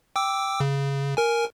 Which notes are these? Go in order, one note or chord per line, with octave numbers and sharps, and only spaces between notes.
G5 D6 E6
C#3
A#4 G#5